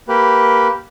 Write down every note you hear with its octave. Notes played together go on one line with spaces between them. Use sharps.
A#3 G4 B4